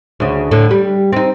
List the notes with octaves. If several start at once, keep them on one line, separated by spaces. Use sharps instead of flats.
D2 C#3
A2 D3
G3
C4 D#4